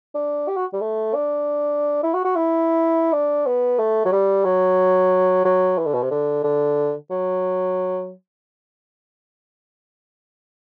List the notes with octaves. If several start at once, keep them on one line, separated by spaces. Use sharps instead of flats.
D4
G4
F#4
G3
A3
D4
E4
F#4
F#4
E4
D4
B3
A3
F#3
G3
F#3
F#3
E3
D3
B2
C3
D3
D3
F#3